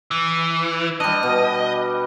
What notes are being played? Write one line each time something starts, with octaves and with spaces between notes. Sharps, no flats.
E3
G3 D4 D#5
B2